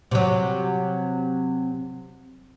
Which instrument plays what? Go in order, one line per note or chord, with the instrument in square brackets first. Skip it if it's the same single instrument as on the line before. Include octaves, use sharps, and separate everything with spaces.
[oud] C3 F#3